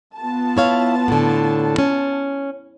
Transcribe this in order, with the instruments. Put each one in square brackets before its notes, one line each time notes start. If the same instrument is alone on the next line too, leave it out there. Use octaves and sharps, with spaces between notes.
[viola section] B3 F4 A5
[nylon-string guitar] E4 C#5 F5
A2 D3
C#4